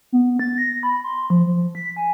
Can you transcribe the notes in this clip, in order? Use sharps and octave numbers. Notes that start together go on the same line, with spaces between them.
B3
A6
A#6
B5
C6
F3
F3
B6
G#5